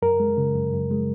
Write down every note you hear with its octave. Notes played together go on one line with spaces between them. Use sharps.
F#2 A#4
G#3
C#3
F#2
F#2
G#3